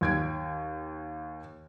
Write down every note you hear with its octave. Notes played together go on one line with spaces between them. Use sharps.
D#2 G#6 D7